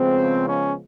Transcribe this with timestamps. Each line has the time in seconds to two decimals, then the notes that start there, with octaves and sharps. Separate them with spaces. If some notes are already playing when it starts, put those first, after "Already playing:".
Already playing: C#3 F3 G#3 B3 C4
0.46 C#4